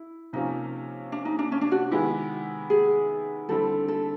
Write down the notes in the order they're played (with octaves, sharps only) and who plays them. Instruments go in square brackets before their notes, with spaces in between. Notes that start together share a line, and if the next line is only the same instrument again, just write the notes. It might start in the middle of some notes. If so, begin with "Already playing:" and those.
Already playing: [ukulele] E4
[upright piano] C3 F3 A#3 C#4 [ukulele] D#4
[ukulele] D4
D#4
D4
C#4
D4
F#4
[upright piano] D#3 G#3 B3 E4 G4
[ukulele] G#4
[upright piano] D3 G3 C4 E4 [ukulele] A4
[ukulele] A4